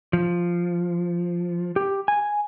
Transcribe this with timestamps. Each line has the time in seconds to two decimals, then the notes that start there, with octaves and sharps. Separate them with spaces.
0.13 F3
1.76 G4
2.08 G#5